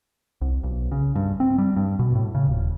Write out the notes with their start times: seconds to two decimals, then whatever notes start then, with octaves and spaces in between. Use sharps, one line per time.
0.41 C2
0.63 B1
0.92 C#3
1.16 G2
1.40 C4
1.58 G3
1.76 G2
1.99 B2
2.15 A2
2.35 C#3
2.47 D#1